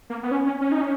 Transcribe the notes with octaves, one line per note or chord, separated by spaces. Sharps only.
A#3
B3
C#4
C#4
C#4
D#4
C#4